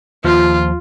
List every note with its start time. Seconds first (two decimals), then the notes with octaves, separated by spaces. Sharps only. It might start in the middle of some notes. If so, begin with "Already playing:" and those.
0.25 D#2 F3 F4